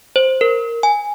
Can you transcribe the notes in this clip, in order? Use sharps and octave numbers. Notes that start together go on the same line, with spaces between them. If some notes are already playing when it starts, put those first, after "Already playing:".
C5
A#4
G#5